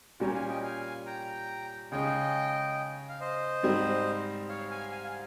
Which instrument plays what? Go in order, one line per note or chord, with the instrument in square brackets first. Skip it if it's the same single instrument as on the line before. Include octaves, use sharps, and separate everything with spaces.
[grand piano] A#2 G3 C#4 [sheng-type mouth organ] G4 A#4
[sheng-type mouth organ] F5 G#5
D#5 G5
F5 G#5
G5 A#5
[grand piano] C#3 G#3 C#4 [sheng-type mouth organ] D#5 G5
[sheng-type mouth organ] F5
C5 D#5
[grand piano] G#2 G3 C4
[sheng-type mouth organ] C#5 F5
F5 G#5
F5 G#5
F5